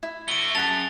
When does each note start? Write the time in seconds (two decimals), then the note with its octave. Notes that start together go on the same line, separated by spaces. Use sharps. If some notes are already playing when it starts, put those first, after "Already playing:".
0.03 E4
0.28 A3 F#4 D7 G7
0.55 F#2 G#4 F#5 A5 A6 F7